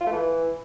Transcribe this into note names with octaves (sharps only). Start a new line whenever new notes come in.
F4
A3
E3